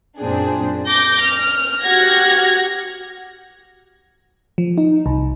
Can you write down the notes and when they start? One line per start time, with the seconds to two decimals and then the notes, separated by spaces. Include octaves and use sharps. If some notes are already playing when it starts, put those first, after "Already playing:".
0.19 F#2 A#2 C4 D4 G#4
0.87 D6 G6 A#6
1.22 F6
1.83 F#4 G4 F#5 F6 G#6 A#6
4.58 F3
4.78 D#4
5.06 C2